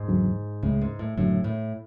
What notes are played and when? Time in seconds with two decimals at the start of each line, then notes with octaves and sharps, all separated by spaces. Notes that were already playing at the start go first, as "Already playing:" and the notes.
Already playing: G#2
0.08 F#1 E2 D3 F#3
0.63 C#2 A2 C#3 G#3
0.81 G#2
0.99 A2
1.17 F#1 F#2 A2 D3 F#3
1.44 A2